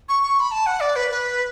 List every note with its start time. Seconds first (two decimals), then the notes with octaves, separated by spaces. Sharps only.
0.09 C#6
0.23 C#6
0.40 B5
0.51 A5
0.66 F#5
0.81 D5
0.96 B4
1.11 B4